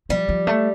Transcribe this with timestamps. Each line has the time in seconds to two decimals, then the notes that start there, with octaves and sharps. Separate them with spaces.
0.09 F3 G3
0.29 F3
0.47 A3